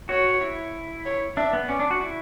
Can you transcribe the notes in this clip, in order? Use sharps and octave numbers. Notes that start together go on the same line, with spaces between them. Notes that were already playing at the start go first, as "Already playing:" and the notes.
F#4 C#5
E4
C#5
D4 E5
B3
C#4 D5
D4
F#4
E4